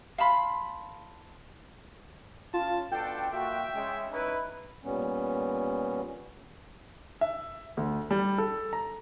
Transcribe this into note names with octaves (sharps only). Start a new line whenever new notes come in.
F5 A5 B5 C6
C#3 F4 A5
B2 D4 F4 A4 G5
A#2 F#4 E5
C#3 G#3
C#4 D#4 E4 B4
A#2 G3 B3 C#4
E5
D2
G3
A4
A#5